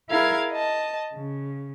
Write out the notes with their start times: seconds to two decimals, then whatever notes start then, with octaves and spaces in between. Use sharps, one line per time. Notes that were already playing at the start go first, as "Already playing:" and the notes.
0.10 E4 G#4 A#4 F5 G#6
0.52 D#5 A5
1.16 C#3